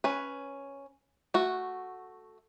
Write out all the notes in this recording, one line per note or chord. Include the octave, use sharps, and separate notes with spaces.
C#4 B4
A3 F#4